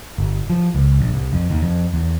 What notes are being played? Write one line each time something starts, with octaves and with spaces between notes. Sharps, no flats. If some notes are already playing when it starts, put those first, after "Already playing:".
G1
F3
C#2
A#1
C2
F2
D#2
F2
E2